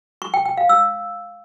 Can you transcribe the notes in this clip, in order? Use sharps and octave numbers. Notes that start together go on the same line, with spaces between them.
C#6
G5
G5
F5
E6